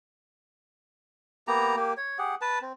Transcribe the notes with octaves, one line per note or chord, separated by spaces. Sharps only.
A#3 B3 G4 A#5
A#3 G4
C#5
G4 G#4 F#5
B4 A5
C4